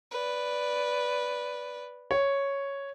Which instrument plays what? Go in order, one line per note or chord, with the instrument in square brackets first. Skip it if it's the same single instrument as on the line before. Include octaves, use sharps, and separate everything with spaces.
[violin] B4 D5
[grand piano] C#5